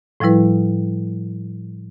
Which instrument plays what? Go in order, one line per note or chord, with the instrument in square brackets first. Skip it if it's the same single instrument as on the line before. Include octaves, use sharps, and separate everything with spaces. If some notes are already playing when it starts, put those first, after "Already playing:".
[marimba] A2 F3 G3 E4 B4